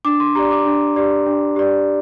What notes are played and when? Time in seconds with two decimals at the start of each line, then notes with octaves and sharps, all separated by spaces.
0.05 D4 D6
0.20 C6
0.35 G4 D5 A#5
0.51 D6
0.65 D4
0.96 G4 D5
1.27 D4
1.56 G4 D5